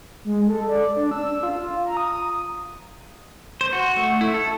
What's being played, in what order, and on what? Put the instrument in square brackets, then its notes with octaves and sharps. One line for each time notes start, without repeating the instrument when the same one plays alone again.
[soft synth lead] G#3
A4
D5
D4
E6
F4
A#5
D#6
[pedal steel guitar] C5
F#4
A3
E4
A4